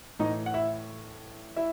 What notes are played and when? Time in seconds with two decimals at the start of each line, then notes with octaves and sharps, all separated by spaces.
0.19 A2 E3 D#4 D#5
0.46 F#5
0.54 E4 E5
1.56 E4 E5